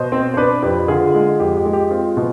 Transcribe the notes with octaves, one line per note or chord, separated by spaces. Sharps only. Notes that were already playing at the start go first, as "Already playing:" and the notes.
Already playing: B2 C5 D#5
C4
C5
D4 B4 D5
F2 G4 B4
D3 F4 G#4
G#3
F2 G4
G4
G#3
G4
C4 F4
B2